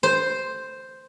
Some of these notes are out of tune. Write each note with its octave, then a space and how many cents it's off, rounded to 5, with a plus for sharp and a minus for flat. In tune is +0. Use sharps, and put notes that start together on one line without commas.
C5 +0